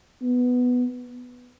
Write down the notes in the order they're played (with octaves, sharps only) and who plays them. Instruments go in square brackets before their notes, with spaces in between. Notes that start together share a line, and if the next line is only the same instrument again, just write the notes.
[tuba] B3